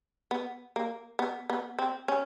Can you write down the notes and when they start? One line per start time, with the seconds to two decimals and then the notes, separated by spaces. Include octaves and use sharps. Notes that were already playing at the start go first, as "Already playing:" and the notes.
0.31 B3
0.76 A#3
1.19 B3
1.50 B3
1.79 C4
2.08 C#4